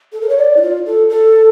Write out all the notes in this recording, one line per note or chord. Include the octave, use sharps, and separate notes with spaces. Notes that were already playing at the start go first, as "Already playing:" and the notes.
A4
A#4
C#5
D5
E4
F4
A4
A4